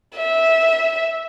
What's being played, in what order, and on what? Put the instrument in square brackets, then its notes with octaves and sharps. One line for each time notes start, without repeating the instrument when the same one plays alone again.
[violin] E5